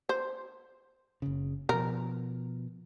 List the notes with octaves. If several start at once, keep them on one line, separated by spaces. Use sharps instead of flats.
C5
F#1 C#3
B2 F3 A#4